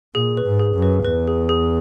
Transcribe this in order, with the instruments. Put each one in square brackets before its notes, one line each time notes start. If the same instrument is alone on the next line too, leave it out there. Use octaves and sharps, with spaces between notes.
[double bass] A#2 [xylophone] G#4
[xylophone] B4
[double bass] G#2
[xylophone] G#4
[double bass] F#2
[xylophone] B4
[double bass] E2 [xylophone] B4
[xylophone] G#4
G#4